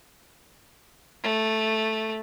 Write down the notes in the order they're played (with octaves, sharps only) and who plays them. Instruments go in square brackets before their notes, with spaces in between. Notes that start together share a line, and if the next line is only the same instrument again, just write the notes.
[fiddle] A3